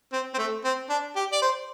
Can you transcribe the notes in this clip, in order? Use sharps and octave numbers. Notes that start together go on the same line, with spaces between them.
C4
C4
A3
C4
D4
G4
D5
C5